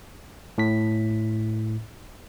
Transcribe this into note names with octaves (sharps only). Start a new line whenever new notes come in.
A2 B6